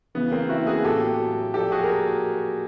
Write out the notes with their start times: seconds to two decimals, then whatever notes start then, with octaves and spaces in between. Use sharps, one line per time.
0.15 C#3 E3 B3
0.32 A#3 C4
0.49 E4 F#4
0.67 F#4 G#4
0.84 A2 F#3 G4 A4
1.54 A#2 F3 G4 A4
1.72 F#4 G#4
1.84 A#4